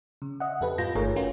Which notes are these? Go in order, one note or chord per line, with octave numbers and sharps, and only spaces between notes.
C#3
D#5 E5 F#5
F2 G4 A4 B4
G#2 F4 G6 A#6
G1 D#3 A3 G#4 A#4 C#5
C#4 F4 F#4 B4